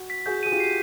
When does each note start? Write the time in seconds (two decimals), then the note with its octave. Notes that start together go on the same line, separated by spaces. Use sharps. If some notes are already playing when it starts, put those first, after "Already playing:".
Already playing: F#4
0.10 B6
0.26 F#4 G#4 G6
0.43 G#4 D#7
0.51 F4 G4
0.60 C7